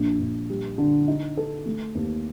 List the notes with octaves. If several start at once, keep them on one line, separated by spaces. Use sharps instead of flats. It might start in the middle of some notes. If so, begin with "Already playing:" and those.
Already playing: A#1
A#1
G3
D3
D#4
A4
A3
D#2